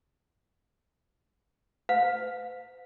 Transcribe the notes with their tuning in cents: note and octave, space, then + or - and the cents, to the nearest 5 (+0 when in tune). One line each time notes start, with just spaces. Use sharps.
C5 -45 F5 +35